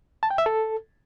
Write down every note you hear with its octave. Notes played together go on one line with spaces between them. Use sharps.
A5
G5
E5
A4